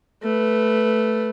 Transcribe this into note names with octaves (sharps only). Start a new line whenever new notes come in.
A3 B4